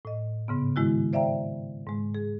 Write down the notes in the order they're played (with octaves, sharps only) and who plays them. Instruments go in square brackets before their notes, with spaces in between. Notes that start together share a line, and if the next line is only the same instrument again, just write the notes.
[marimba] A2 D#5
G#2 C#3 B3
D#3 G#3 E4 F#4
C5 D5 E5 F5 G5 A#5
G#2 G#3
G#4